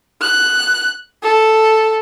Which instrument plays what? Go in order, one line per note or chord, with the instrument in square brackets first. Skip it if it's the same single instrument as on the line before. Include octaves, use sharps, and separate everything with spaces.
[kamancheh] F#6
A4